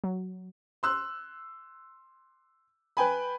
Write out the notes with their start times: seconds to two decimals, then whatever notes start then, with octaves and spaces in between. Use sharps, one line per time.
0.04 F#3
0.83 C6 E6 F#6
2.97 B4 G5 G#5 B5